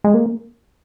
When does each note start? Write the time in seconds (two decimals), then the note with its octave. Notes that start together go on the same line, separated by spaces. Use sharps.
0.04 G#3
0.14 A#3